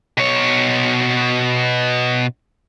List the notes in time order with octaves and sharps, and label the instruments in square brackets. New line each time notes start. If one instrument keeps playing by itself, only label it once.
[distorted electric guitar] B2 C#5